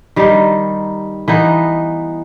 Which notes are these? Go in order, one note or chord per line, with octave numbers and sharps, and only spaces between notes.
D#3 G3 D#4
E3 B3 D#4